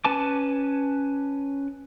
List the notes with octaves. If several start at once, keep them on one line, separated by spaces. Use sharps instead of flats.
C#4 B4 G#5 A5 D6